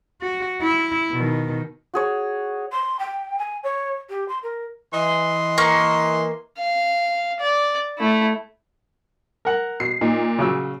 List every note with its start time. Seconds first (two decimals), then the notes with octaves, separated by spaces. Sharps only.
0.22 F#4
0.63 E4
1.13 B2 D#3
1.94 F#4 G#4 C#5
2.72 C6
2.99 G5
3.39 G#5
3.64 C#5
4.09 G4
4.29 C6
4.43 A#4
4.94 E3 D#5 C6
5.58 A#3 C#6
6.58 F5
7.41 D5
7.98 A3 E4
9.45 A#4 F#5
9.80 B2 C7
10.01 A#2 D#4
10.39 C#3 F#3 E6